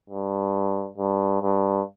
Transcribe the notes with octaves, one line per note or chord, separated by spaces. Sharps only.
G2
G2
G2